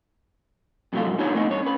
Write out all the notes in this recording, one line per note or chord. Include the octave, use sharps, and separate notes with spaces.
F2 C3 F#3 G3 A3 F4
F2 G#2 F#3
B3 D4 D#4 F4 G4 C#5
A3 B3 C4 D#4
G2 C#5
C#4 B4